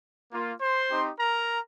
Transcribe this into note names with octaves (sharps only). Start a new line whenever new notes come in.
A#3 F4
C5 C6
C4 D#4 G4
A#4 A#5